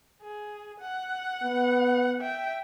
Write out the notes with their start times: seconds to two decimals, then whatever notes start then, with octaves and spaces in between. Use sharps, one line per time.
0.22 G#4
0.80 F#5
1.43 B3
2.20 E5 G5